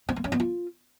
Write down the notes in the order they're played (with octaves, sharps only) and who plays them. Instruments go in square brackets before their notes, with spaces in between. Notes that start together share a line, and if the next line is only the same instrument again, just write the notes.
[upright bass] C4
A#3
C#4
B3
F4